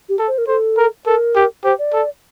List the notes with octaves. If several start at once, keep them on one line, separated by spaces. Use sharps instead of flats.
G4
A4
C5
A#4
A4 C5
A#4
A4 A#4
G4
G4 C5
D5
A4